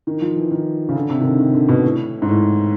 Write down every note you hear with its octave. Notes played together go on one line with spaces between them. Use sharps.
D#3
F3
E3
D#3
C#3
D3
C3
D#3
D3
D#3
D3
B2
A2
G#2
A2